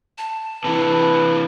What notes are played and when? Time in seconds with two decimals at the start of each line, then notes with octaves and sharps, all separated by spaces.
0.18 A5
0.64 C3 E3 B4